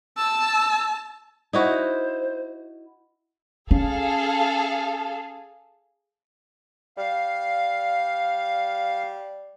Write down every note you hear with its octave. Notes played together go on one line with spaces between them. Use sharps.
A5 E6
D#4 E4 F#4 C5
C#4 G#4 A4 F5
G3 F5